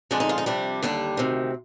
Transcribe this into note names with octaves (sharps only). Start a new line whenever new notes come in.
F2 D3 G#3 D4
D#4
F4
D#4
F2 C3 G3 D4
D#2 D3 G3 D4
D2 C3 D#3